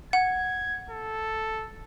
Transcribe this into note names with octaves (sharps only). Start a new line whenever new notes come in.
F#5 G#6
A4